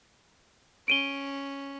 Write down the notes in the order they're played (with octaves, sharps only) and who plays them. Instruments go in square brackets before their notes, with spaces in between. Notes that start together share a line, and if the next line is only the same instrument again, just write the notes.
[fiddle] C#4 [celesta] D7 D#7 G7